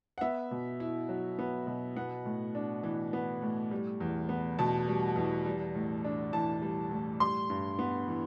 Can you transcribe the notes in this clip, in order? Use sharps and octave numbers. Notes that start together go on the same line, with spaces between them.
F#5
B3 E5
B2
E4
F#3
B3
B2
B3 F#5
A2
D4
E3
B3
A2
G3
E2
B3
B2 A5
G3
E2
G3
A2
D4
E3 A5
G3
A2
G3 C6
G2
B3
E3